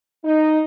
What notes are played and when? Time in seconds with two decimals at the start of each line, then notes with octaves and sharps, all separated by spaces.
0.23 D#4